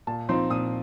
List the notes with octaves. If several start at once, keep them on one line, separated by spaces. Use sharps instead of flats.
A#2 A5
F3 C4 D#4 C6
A#2 D#6